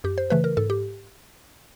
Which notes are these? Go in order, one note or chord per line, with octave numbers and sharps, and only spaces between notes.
F#2 G4
C5
C#3 E3 A3 B4
A#4
G#2 A4
G4